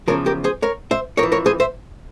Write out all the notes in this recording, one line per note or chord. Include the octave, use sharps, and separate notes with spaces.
E2 C#3 F3 A#4 C#5
G4 A#4
G#4 C5
A#4 C#5
C5 E5
F2 A#4 C#5
E3
A#4 C#5
G#4 C5
C5 E5